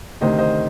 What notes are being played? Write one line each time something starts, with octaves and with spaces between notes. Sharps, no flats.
D2 C3 D#3 C5 D#5
C5 D#5